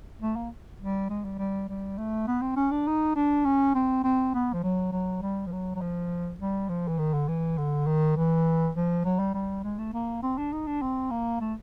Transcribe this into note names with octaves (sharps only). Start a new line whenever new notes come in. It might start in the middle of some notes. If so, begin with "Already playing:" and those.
A3
A#3
G3
G#3
G3
G3
G3
A3
B3
C4
C#4
D4
D#4
D4
C#4
C4
C4
B3
F3
F#3
F#3
G3
F3
F#3
F#3
F3
G3
F3
E3
D#3
D3
E3
D3
D#3
E3
F3
F#3
G3
G3
G#3
A3
A#3
C4
D4
D#4
D4
C4
A#3
A3